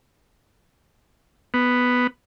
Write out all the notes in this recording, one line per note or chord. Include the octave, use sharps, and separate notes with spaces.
B3